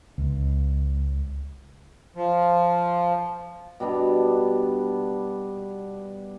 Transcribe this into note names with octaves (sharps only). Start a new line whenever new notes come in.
C#2
F3
B2 G3 B3 D4